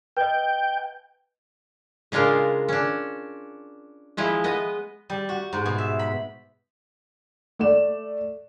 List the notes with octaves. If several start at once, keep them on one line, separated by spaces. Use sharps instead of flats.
B4 D#5 G5
C#3 G#3 D4 F4 A#4
C#4 D4
F3 G#3 E4
B3 D#5
G3
F#4
G#2
B2
E5
B5
A3 D5 E7